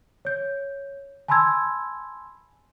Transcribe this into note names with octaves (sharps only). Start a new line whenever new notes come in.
C#5 G6
G#5 A5 B5 C6 E6 G#6